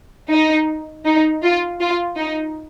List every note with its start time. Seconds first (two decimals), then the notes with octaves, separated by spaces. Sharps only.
0.30 D#4
1.06 D#4
1.43 F4
1.80 F4
2.17 D#4